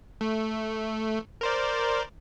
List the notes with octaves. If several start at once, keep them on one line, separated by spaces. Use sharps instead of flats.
A3
A#4 C5 D5